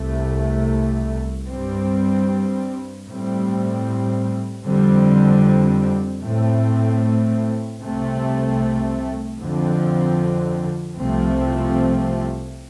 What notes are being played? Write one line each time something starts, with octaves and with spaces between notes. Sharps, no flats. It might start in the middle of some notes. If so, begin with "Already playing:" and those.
Already playing: C2 C3 A3
G2 G3 C4
A2 G3 C4
F2 D3 G3 C4
A2 A3 C4
C2 C3 A3 C4
F2 D3 F3 C4
C2 C3 F3 A3 C4